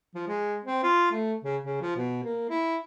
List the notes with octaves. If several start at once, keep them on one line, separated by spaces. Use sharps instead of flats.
F3
G#3
C4
F4
A3
C#3
C#3
F3
B2
A#3
E4